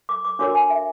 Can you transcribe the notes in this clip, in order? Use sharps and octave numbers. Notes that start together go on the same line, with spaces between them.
D6
D6
D4 F#4 A#4 C#5 D6
G#5
E5